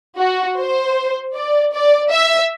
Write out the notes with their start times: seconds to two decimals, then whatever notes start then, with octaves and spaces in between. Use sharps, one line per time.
0.19 F#4
0.58 C5
1.35 D5
1.73 D5
2.12 E5